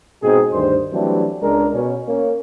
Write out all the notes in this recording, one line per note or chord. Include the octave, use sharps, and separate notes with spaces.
G#2 B2 C4 D#4 G#4
D2 G2 D#3 C5
E3 F#3 G3 A3 C4 D4
C#2 G#3 D4 A#4
B2 C#4
A#3 C#4